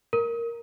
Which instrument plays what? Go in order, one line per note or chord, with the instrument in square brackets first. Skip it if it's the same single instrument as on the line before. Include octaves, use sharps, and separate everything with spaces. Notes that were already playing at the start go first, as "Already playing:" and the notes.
[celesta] A#4